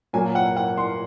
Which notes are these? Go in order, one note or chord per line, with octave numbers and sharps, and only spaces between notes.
A#2 F#3 A#3 G#5
F#5
F#5
C6